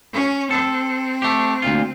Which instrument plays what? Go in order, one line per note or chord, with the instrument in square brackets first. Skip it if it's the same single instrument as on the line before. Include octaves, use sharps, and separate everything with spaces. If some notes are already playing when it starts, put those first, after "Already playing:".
[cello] C#4
[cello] C4 [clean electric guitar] A4
[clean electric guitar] A3 G4
D2 A#2 F4